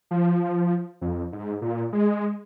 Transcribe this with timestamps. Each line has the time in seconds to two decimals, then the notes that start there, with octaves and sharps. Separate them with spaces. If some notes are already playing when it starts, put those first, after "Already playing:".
0.11 F3
1.01 F2
1.32 G#2
1.62 A#2
1.93 G#3